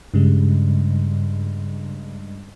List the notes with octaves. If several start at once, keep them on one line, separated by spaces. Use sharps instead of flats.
G2 C#3 G3 G#3